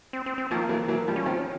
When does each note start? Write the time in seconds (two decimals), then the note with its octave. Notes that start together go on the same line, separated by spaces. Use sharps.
0.13 C4
0.26 C4
0.38 C4
0.51 D#3 F3 A#3
0.69 E3 F#3
0.88 E3 F#3
1.08 F3 G3
1.16 C#4
1.26 D#3 F3 C4
1.39 C#4